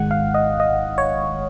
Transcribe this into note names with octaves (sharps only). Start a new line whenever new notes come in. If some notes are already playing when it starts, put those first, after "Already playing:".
Already playing: G#1 G#2 D#3 G#3 F#5
F5
D#5
D#5
C#5